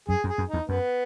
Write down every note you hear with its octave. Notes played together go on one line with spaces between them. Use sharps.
F#2 G#4
F#2
G#4
F#2
E2 D#4
F#2 B3